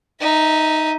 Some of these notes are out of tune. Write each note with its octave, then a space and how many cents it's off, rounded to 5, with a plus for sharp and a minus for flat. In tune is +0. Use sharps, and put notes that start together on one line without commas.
D#4 +0 E5 -25